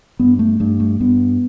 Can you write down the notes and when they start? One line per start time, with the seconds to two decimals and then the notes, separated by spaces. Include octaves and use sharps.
0.19 G2 B3
0.39 A3
0.60 G2 A3
0.80 A3
1.00 G2 B3